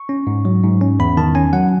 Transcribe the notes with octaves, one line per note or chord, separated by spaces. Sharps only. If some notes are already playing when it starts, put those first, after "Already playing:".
Already playing: C#6
C#4
G#2
F#3
G#2
C#4
E2 B5
D#3 A5
C#4 G#5
F#3 F#5